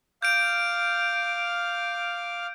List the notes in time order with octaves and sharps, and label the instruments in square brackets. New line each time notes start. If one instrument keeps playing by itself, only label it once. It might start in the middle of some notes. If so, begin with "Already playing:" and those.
[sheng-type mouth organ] F5 D6 F6 [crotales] G6 D7